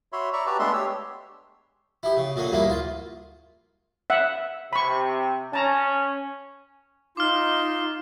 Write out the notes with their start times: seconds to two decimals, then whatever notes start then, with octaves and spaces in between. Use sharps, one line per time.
0.13 F#4 C#5 E5 B5 C6
0.33 D5 E5 A#5 B5 C#6
0.46 F#4 G4 B4 D5 A5 A#5
0.59 G#3 A3 B3 D4 E5 C6
0.73 G4 C#5 E6
2.03 E4 G4
2.17 C#3
2.36 A#2 D3 C#4
2.52 D2 G2 G#3 A#3 E4
2.70 F4
4.10 E5 F#5
4.73 C3 B5 C#6
5.53 C#4 A5 A#5
7.17 D#4 F4 C6 D6 F6